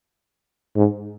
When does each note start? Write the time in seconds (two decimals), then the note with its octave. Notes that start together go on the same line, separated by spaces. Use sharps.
0.76 G#2